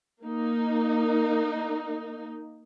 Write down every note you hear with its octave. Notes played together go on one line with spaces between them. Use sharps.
A#3 D#4